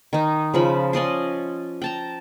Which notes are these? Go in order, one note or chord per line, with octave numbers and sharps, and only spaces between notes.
D#3 D#4
C#3 F3 B5
C#4 D5 D#5 C6
G5 A5 A#5